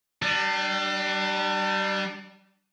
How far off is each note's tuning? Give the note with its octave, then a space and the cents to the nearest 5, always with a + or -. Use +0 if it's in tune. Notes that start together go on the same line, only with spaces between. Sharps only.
G3 -25 D4 +30